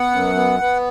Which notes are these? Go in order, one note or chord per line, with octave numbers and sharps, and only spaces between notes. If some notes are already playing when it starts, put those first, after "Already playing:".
Already playing: B3 F#5
F#2
B3
B3